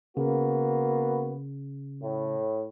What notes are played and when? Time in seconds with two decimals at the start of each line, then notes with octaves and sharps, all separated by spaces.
0.17 C#3 A#3 B3 F#4
2.02 A2